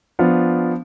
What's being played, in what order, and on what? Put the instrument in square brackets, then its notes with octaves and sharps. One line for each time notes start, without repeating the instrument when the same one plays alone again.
[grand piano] F3 B3 D4 F4